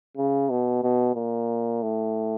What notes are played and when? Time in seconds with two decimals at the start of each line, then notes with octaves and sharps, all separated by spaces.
0.17 C#3
0.50 B2
0.83 B2
1.15 A#2
1.82 A2